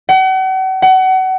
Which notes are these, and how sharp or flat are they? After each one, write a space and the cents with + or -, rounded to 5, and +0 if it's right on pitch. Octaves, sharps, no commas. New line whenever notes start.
F#5 +40
F#5 +30